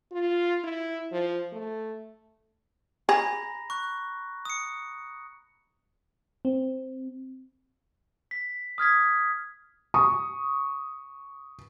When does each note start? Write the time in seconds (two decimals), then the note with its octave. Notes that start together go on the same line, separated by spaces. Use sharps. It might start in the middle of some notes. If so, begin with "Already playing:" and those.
0.12 F4
0.64 E4
1.12 F3
1.52 A3
3.09 G#4 A#5 B5 A#6
3.70 C#6 F#6
4.45 D#6 C#7
6.45 C4
8.31 B6
8.78 D#6 F6 G#6 B6
9.94 C#6 D#6